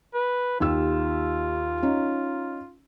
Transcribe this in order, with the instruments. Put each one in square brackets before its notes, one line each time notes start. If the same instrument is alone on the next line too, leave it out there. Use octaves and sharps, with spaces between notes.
[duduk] B4
[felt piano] D#2 G4 E6 [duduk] F4
[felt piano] C#4 D#4